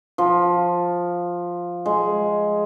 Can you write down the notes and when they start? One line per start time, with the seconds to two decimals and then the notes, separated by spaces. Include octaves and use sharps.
0.18 F3
1.86 G#3